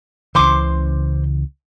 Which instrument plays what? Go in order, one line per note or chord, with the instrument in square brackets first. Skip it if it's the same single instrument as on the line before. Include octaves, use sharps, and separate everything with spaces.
[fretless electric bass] C#2 C#3 E3 [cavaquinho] C5 C6 D6